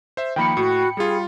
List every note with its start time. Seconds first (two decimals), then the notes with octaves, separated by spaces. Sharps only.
0.17 C5 E5
0.36 D#3 F3 A#3 G5 B5 C#7
0.57 A2 F#4
0.97 G3 F4 G#4